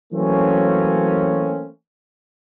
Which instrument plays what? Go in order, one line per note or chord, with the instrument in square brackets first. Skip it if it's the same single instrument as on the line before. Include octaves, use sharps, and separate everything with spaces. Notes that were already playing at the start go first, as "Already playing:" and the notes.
[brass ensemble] E3 F#3 A3 A#3 C4 C#4